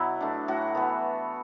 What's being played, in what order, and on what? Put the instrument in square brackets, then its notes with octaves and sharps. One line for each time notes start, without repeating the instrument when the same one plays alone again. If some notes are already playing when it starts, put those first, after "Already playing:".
Already playing: [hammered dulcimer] B2 F#3 B3 E4 B4
A3 D4
A2 F#4
E3 B3